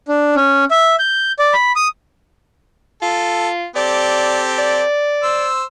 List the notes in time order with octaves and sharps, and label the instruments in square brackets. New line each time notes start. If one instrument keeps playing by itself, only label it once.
[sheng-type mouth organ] D4
C#4
E5
G6
D5
B5
D#6
[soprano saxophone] F4 [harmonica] A4
[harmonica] C4 G4 A4 [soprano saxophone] D5
[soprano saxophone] D5
[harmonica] C5 E6